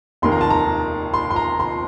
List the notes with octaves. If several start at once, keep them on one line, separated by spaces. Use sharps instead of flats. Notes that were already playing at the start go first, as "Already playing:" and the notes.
F1 D#2 D#3 A#3 C6
A#5
A5
A#5
C6
C6
A#5
C6